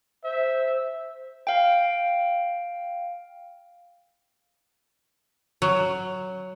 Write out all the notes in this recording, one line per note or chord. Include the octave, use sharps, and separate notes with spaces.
C5 E5
F5 G5
F#3